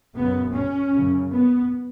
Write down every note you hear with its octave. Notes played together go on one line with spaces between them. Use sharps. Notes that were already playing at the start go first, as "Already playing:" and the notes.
F#2 C#3 B3
C#4
F#2 C#3
B3